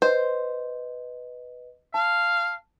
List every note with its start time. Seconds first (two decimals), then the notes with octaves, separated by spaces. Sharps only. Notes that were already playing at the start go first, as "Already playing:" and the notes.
0.02 B4 C5 D#5
1.94 F5 A5